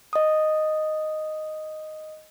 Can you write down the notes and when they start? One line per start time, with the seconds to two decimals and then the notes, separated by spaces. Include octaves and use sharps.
0.13 D#5 D#6